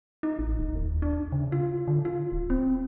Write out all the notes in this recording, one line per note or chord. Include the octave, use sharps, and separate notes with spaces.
D#4
A1
D#1
D#2
D4
C#3
F4
D3
F4
D1
C4